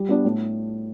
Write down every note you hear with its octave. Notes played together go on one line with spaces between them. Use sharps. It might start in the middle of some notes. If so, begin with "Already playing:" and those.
Already playing: G3
B3 D4
A2